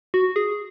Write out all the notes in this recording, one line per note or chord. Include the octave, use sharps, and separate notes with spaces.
F#4
G#4